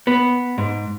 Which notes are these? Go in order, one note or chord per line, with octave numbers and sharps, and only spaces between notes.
B3
G#2